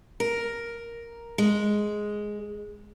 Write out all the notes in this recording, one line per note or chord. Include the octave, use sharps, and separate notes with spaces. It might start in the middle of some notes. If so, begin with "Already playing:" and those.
A#4
G#3